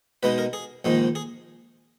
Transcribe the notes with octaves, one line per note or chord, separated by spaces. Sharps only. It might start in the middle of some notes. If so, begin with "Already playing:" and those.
B2 G#3 D#4 B4
A#4
G#4
A#1 G#2 D#3 G#3
G#4